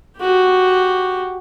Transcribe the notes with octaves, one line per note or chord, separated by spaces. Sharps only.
F#4 G4